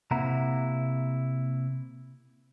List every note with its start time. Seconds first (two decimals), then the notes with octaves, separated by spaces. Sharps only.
0.11 C3 A#3 E4 F#5 A#5